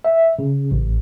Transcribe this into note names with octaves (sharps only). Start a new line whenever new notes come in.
E5
C#3
A1